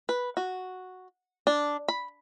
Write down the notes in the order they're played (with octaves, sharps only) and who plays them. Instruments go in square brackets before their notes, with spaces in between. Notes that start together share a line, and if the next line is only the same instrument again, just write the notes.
[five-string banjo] B4
F#4
D4
B5